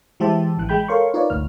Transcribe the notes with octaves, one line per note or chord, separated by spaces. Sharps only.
E3 G#3 G4 C5 E5 A5
A1 E3 F#6
G#3 G5 B5 G6
A4 A#4 C#5 F5 C6 C#6
D#4 F4 A#4 B4 C#5 D5
G1 D2 F6